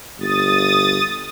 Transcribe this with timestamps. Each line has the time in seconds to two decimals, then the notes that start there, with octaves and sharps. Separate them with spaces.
0.20 G1 D#6 A6